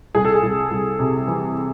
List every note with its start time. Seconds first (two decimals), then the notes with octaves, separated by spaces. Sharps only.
0.15 C2 G#4
0.25 A4
0.34 G#4
0.43 C2
0.71 C2
0.99 C3
1.27 E3